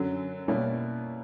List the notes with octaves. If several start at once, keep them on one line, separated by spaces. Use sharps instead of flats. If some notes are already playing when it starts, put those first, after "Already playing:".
Already playing: F#2 D3 F#3
B2 G3 A#3 C#4 E4